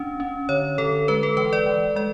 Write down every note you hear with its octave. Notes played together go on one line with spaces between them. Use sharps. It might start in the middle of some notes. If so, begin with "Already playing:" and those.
Already playing: C#4 D4
C#4
D3 C#5
D3 A4
G#3 B4
A4
E3 B4
D5
E3
G#3 D5